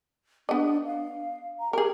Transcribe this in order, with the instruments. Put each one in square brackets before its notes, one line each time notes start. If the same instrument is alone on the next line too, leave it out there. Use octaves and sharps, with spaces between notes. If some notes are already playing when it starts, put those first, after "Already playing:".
[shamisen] B3 D#5 [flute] D4
[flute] F5
A#5
[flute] G4 [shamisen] G#4 A#4